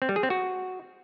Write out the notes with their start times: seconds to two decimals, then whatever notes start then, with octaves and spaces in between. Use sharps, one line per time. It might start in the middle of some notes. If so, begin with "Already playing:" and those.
0.02 C4
0.09 G3
0.16 G#4
0.23 C4
0.30 F#4